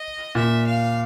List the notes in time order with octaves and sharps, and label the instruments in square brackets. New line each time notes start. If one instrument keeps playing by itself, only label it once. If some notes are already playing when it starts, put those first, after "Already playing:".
Already playing: [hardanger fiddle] D#5
[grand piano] A#2 [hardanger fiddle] E5
[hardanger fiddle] F5